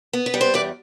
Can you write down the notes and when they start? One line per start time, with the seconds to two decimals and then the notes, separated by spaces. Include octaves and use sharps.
0.13 B3
0.26 B4
0.34 G3
0.41 C5
0.54 E2 B4 D5